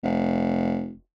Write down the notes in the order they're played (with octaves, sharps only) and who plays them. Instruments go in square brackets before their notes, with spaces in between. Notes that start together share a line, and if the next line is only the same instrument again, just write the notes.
[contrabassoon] F1